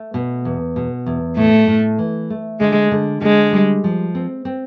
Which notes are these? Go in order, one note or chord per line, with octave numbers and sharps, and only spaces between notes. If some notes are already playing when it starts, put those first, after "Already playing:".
Already playing: A3
B2
E2
B2
E2
A2 A3
A2
E3
A3
D3 G#3
D3
D3 G#3
G3
F3
C4
C4